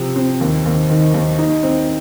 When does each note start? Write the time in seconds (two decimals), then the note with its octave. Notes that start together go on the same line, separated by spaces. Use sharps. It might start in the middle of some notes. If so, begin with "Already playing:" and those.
Already playing: C3 F3 C4
0.16 C4
0.41 D#2
0.66 D#2
0.90 D#3
1.14 D#2
1.38 D#4
1.63 C4